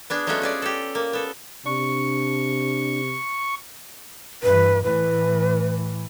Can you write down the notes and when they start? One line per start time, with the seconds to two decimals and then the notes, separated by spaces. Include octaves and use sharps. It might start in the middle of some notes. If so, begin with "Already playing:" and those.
0.10 B3 D4 G#4
0.27 F#3 G#3 A3 C#4 F4 F#4
0.42 C#4 G#4 D5
0.62 G4 A4
0.95 A#3
1.13 B3 A4
1.65 C3 D4 C#6
4.43 G2 E3 B4
4.83 A2 E3 B4